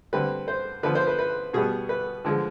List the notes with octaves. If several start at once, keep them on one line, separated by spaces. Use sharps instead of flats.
D3 G3 C4 B4
C5
D3 F3 B3 B4
C5
B4
B4
B2 G3 B3 G#4
B4
D3 F3 G#3